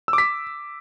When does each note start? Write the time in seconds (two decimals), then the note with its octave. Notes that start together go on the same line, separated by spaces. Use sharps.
0.08 E6
0.13 D6
0.18 B6